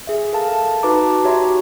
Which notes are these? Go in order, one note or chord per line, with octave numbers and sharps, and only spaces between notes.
G#4 E5
A4 A#4 F5 A5
D#4 F#4 B4 A5 A#5 D6
F#4 G4 C#5 E5 A#5 C6